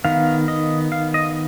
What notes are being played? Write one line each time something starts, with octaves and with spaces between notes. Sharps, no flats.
D#3 B3 F5
D#5
F5
D#5